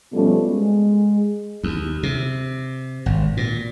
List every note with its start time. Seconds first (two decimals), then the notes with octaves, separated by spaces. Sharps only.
0.12 B2 F3 G3 A3 B3 C#4
0.46 G#3
1.63 D#2
2.03 C3
3.06 G#1
3.37 A#2